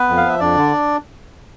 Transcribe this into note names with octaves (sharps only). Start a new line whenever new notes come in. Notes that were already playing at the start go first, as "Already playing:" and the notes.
Already playing: B3 B4
F2
F5
F3 E5
F2 D4 D5
D3